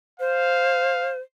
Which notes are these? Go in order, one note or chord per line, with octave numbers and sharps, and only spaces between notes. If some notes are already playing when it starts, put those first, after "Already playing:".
C5 F5